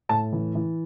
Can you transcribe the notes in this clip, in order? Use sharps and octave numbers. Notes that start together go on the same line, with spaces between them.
A2 A5
E3
E3